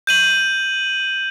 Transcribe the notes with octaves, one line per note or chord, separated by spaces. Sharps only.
G6 D#7 F#7